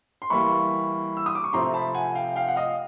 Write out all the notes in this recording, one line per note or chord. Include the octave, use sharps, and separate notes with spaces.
C6
E3 G3 A#3 B5 C#6
E6
D#6
D6
C#6
C3 F3 A3 C4 A#5 C6
A5 B5
F#5 G#5
F5 G5
F5 G5
F#5
D#5 F5